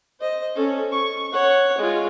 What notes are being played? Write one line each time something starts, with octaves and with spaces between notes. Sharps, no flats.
C5 D#5
C#4 A4
C#6
C#5 F#5
G#3 F4